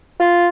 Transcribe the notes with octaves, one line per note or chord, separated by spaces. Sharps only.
F4